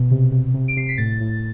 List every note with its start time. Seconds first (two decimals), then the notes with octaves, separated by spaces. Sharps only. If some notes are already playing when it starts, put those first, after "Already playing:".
Already playing: B2
0.11 C3
0.32 C3
0.54 C3
0.68 D7
0.77 C3 C7
0.88 B6
0.98 A2 A6
1.21 A2